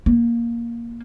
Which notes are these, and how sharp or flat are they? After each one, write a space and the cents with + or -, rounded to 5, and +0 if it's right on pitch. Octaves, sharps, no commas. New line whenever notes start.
A#3 +5